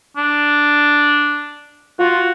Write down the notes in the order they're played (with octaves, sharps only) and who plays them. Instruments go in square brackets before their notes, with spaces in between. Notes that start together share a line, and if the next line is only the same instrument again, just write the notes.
[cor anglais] D4
[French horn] F4 [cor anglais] F#4